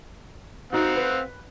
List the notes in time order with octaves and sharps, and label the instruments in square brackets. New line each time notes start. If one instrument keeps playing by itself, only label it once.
[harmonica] C4 F5 F#5 [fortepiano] D#4 F#4
[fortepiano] B4